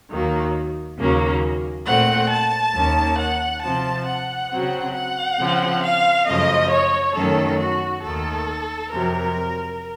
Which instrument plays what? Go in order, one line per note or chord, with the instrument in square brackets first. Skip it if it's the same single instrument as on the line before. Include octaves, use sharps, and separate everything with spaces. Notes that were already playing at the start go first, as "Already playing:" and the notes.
[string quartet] D#2 D#3 F#3 A#3
D#2 C#3 F#3 A#3 C#4
A#2 A3 C4 F#5
A5
D#2 D#3 A#3 C#4
F#5
C3 F3 C4 A5
F#5
C#3 F#3 C4
F#5
C#3 F3 C4
F5
F#2 C#3 F3 A3 D#5
C#5
F#2 D#3 F#3 A3 C#4 A4
F#4
D#2 D#3 A3 A4
F2 C3 F#3 A#4